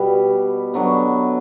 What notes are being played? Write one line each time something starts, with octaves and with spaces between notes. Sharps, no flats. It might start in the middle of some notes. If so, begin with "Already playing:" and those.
Already playing: B2 G3 B3
D3 F#3 B3